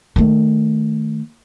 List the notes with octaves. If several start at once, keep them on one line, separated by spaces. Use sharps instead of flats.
D#3 A3